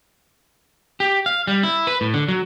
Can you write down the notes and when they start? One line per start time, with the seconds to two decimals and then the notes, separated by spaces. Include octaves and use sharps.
1.00 G4
1.26 F5
1.47 G3
1.63 E4
1.87 B4
2.01 A2
2.14 D3
2.28 F#3